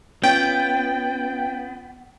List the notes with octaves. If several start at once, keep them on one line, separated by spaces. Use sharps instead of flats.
B3 C#4 F4 G5